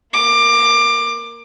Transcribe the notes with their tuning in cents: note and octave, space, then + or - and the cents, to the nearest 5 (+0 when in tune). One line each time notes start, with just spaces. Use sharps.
A#3 +0 D6 +20